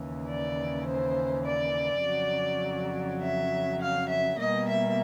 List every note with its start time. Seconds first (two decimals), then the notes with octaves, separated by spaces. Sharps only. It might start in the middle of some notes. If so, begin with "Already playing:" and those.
Already playing: D#2 C#3 E3
0.26 D5
0.86 C5
1.45 D5
2.02 F2 C#3 F#3
3.21 E5
3.80 F5
4.08 E5
4.38 B2 G3 A#3 D#5
4.68 E5